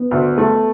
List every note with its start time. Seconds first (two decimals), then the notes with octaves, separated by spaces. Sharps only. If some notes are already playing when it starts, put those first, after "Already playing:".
Already playing: B3
0.11 D2
0.38 A3